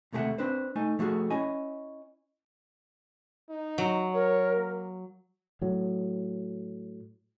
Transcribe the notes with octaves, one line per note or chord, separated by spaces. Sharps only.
D#2 C3 A3 G#4 E5 F#5
C4 D4 B4 C5
A3 D#4 G#5
F3 A3 F#4 G#4
C#4 E4 D#5 G#5
D#4
F#3
A#4 C#5
A#3
A2 F#3